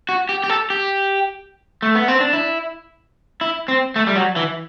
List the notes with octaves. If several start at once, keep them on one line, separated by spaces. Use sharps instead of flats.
F#4
G4
G4
A4
G4
A3
B3
C4
D4
E4
E4
C4
A3
G3
F#3
E3